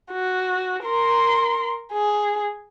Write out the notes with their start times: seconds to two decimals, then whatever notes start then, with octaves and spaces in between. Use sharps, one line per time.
0.12 F#4
0.84 A#4 C6
1.93 G#4